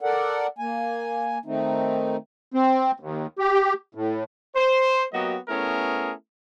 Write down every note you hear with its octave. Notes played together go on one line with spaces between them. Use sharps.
A4 A#4 D5 F#5
A#3 G#5
D#3 A3 C4 D#4
C4
D#2
G4
A2
C5
F#3 A#3 B3 F#4 G4 D#5
A3 B3 C#4 E4 G#4 A#4